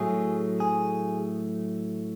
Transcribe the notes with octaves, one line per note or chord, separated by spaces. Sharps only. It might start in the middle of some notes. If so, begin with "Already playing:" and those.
Already playing: A2 F#3 A3 G#4
G#4